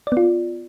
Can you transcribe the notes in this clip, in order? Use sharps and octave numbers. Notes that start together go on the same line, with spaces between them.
B3 F4 D5